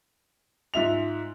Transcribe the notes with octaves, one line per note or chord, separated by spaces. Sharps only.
G#2 F4 E5 F7